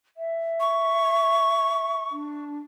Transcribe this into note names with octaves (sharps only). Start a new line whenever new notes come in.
E5
C#6
D4